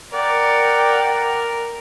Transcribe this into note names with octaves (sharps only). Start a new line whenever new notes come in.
A#4 D5 F#5 G5